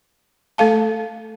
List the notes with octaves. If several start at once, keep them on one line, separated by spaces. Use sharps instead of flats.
A3 A4 F5 A5